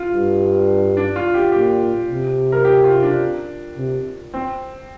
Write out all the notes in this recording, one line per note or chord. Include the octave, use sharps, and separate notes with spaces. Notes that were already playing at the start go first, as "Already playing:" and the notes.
Already playing: F4
G2
D4
F4
G4
A#2 G4
C3
A#4
G4
F4
D4
C3
C4